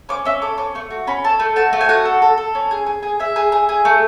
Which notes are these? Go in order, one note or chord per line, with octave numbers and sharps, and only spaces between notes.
C#4 D6
C#4 E5
A4 D6
C#4 D6
A3 C#6
F#4
C#4 B5
A4 A5
A3
F#4 A5
A3
G#5
F#4 F#5
A4
A4
A4
C#4
G#4
G#4
G#4
G#4 E5
G#4
G#4
G#4
A3